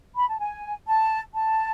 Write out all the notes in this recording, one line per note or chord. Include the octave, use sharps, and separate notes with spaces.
B5
A5
G#5
A5
A5